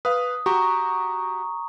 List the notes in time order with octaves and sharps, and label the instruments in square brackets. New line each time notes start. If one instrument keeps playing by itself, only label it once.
[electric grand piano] B4 F5 [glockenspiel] D#6
[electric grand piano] F#4 G4 [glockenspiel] A#5 C#6